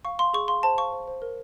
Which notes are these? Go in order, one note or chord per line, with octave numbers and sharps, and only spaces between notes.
F5 C#6
F5 C6
G#4 C#6
F5 C6
C5 A5
F5 C#6
C5
C5
A#4